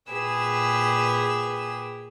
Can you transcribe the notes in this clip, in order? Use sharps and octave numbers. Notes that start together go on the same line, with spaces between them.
A#2 G4 G#4 B4 E6